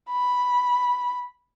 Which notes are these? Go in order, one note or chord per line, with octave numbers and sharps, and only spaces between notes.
B5